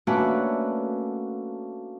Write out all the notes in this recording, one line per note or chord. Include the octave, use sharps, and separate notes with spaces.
A3 A#3 C#4 D4 F#4 B4